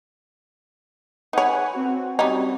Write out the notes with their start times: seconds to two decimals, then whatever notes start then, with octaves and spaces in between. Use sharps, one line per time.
1.33 D#4 B4 C#5 F#5 G#5
1.73 C4 F#4
2.19 G3 C#4 D#4